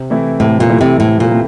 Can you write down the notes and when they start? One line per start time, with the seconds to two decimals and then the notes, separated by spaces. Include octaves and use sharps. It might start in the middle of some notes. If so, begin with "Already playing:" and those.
Already playing: C3
0.10 E3 A3 C4 E4
0.40 A2 C3
0.60 A#2
0.70 E3 A3 C4 E4
0.81 C3
1.00 A2 C3
1.20 A#2
1.30 E3 A3 C4